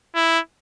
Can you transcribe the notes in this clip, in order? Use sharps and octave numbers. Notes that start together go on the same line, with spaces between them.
E4